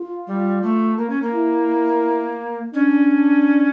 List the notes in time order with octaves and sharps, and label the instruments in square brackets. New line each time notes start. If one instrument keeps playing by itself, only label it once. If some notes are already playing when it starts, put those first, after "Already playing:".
Already playing: [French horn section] F4
[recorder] G3
A3
A#3
C#4
A#3
[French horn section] E4
[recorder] C#4 [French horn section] D4